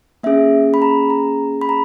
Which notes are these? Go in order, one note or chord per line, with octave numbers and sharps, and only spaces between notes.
A#3 C#4 G#4 E5
B5
A#5
A#5
B5
A#5